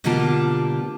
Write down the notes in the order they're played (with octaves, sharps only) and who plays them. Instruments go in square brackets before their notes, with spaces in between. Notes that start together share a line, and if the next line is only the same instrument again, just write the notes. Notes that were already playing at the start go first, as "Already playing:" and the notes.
[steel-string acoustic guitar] B2 D3 G3 A#3 F4 A5